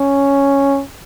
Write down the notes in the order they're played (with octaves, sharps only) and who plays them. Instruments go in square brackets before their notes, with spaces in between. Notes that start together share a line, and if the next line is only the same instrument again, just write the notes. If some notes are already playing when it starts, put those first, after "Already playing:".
Already playing: [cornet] C#4